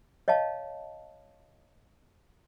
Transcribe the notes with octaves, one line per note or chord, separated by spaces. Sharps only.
C#5 D#5 F5 A5